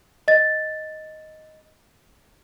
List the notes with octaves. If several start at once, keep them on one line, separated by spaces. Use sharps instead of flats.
D#5 A6